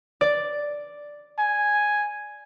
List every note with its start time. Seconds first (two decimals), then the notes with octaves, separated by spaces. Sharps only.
0.21 D5
1.39 G#5